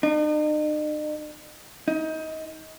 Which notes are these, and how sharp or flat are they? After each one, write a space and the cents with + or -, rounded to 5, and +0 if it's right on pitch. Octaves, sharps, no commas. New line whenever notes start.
D#4 -45
D#4 +25